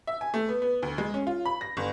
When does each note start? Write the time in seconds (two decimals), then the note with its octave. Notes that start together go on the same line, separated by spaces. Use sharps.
0.07 E5
0.21 G#5
0.34 A3
0.49 B3
0.62 B3
0.83 D2
0.98 G#3
1.14 C#4
1.27 F4
1.45 B5
1.61 A#6
1.77 G1